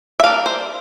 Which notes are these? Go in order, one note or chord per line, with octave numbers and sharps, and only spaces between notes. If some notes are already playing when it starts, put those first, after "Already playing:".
E5
G3 A#3 D4 F5
C5